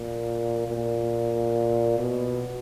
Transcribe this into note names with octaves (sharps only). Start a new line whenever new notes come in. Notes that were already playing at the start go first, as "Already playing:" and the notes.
Already playing: A#2
A#2
B2